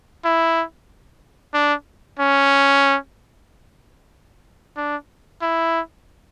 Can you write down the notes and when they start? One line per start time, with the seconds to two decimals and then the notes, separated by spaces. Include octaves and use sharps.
0.25 E4
1.54 D4
2.19 C#4
4.77 D4
5.42 E4